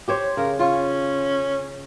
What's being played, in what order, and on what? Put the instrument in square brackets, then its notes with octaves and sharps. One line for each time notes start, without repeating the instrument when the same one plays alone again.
[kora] G4 C5 C#5
[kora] C#3 [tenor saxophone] A#4
[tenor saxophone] C#4 [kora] F4